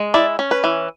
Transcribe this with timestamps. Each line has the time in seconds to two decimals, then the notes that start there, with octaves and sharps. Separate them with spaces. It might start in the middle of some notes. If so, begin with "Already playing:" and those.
Already playing: G#3
0.14 E4 D5
0.39 C#4
0.51 B4
0.64 E3